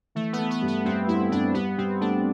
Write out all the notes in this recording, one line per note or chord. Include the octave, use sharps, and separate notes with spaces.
E3 A3
B3
A3
B3
G2
B3
G2 C4
G2 E4
G2 D4
G2 B3
G2 C4
A3 D4